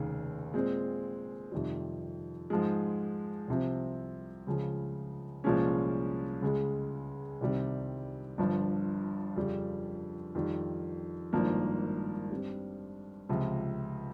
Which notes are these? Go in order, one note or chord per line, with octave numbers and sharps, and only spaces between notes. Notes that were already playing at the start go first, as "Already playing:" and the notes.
Already playing: F1 D#2 C#3
A#2 G#3 C4
F2 C3 D#3 G3
G#2 F3 G#3
C2 C3 F3 C4
C#2 C#3 F3
C2 A#2 F3 G#3 C#4
C#2 C#3 G#3
C2 C3 D#3 G3 C4
G1 G2 F3
F2 C#3 G3
F2 D#3 G3
G#1 G2 F3 A#3
G2 G3 C4
C#2 C3 F3